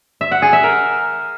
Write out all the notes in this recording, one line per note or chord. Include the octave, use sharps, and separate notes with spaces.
E5
F#5
G#4
E5
A#4